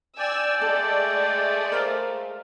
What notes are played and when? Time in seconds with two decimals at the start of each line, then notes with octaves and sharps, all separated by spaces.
0.18 D5 G5 G#5 E6
0.61 G#3 A3 A4
1.72 A#4 C5 F5